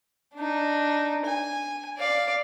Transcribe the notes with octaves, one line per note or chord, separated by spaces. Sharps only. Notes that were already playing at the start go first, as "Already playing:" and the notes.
D4 D#4
G#5
D5 F5